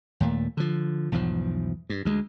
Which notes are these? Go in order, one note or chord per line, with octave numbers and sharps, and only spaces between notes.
D#2 A#2 A3
D3 F3
B1 E2 G#2 F3
G2
D2 G#3